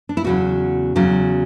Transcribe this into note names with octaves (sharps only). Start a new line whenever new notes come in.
D4
E4
E2 C#3 F#3 F#4
E2 C#3 F#3